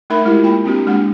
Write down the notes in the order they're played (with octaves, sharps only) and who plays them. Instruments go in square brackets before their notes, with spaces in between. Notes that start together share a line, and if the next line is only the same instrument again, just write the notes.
[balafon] A3 D#4 A#4 E5 B5
G#3 E4 F4 G4 A#4
A#3 G5 B5
A#3 C4 D4 F#4 G4
G#3 A#3 D4 F#5